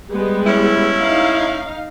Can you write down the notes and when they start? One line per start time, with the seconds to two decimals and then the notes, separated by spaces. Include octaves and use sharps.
0.10 G3 G#3 B3
0.47 A2 C#4 E4
0.99 D#4 F5